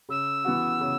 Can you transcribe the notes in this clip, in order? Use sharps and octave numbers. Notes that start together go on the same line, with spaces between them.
C#3 E6
E3 B3 F#4
C#3